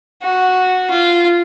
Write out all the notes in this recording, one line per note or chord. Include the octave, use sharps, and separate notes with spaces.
F#4
F4